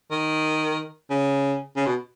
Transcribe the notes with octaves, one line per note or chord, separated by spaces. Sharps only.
D#3
C#3
C#3
B2